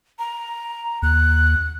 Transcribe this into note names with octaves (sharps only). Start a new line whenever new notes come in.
A#5
D#2 F#6